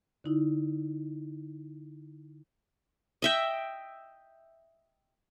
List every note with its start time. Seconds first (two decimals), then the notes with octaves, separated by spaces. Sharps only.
0.24 D3 D#4 E4
3.22 D#5 E5 G5